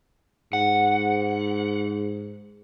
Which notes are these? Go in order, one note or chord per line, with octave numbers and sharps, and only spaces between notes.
G#2 F#5